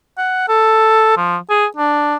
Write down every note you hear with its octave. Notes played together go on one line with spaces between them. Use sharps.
F#5
A4
F3
G#4
D4